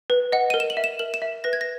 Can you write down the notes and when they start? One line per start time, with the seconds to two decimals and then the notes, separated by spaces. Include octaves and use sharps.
0.10 B4
0.32 D#5 F#5
0.50 A#4 D#7
0.60 E7
0.70 F#7
0.77 E5
0.84 E7
0.99 A#4 F#7
1.14 E7
1.22 E5
1.44 B4 A#6
1.53 G#6
1.61 A#6